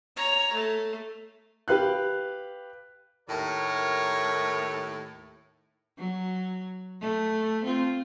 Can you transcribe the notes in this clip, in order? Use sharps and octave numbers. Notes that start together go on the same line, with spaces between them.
C#5 A#5
A3
G4 B4 F5 F#6
D#2 A2 A#4 C#5
F#3
A3
C4 F4